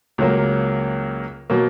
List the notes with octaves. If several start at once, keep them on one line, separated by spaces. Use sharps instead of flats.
C#2 C#3 F#3 A#3
B2 F#3 A#3